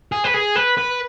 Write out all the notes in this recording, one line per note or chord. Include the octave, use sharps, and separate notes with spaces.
G#4
B4
G#4
B4
B4